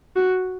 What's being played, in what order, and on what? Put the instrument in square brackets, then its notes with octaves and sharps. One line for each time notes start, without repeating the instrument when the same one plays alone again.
[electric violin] F#4